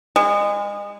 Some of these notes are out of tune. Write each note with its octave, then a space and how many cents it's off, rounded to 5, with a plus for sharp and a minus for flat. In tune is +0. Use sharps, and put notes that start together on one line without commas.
G#3 -30